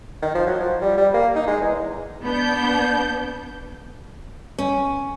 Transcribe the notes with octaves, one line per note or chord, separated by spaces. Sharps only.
D#3
F3
F#3
F3
G3
G3
A#3
D#4
G#3
E2
B3 D4 G6
C#4